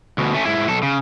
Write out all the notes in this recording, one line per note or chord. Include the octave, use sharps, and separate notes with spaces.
D2 B2
A3 C#4
G#2 E4
B1 A4
C#3